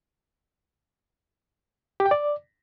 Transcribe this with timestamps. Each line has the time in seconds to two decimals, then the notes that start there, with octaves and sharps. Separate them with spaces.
2.00 G4
2.06 G5
2.11 D5